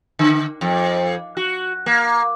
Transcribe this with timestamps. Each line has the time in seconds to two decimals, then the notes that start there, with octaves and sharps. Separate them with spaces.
0.19 D3
0.61 F2
1.37 F#4
1.86 A#3